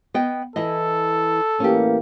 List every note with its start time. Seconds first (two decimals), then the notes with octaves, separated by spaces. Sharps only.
0.14 B3 D#5 G5
0.56 E3 E4 A4 D#5
1.60 A2 E3 A#3 C#4 G4